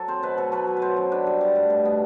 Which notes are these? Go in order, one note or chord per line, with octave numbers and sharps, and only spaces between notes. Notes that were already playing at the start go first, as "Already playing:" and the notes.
Already playing: F#3 A4
C4 C5
B2 B4
B2 A4
F#3 B4
F#3
B4
F#3 C5
F#2
D4 B4
G3
G3
A2
B2
B3